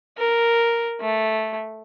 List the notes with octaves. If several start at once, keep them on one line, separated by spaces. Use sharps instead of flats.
A#4
A3